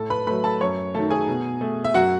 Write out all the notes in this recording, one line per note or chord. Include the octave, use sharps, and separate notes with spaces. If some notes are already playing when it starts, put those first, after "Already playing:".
Already playing: A2 A4 A5
B4 B5
F#3 A3 B4 B5
A4 A5
F#2 C#5 C#6
D#3 F#3 A3 A4 A5
G#4 G#5
B2
A3
E5
F#2 F#4 F#5